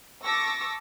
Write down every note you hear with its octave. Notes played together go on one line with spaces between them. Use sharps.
A5 C#6 D6 E6 A#6